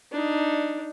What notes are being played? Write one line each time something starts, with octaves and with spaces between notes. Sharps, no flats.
D4 D#4